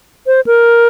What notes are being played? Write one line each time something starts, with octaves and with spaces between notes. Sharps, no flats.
C5
A#4